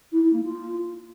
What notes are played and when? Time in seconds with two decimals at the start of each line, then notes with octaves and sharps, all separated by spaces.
0.12 E4
0.22 E4
0.33 A#3
0.43 F4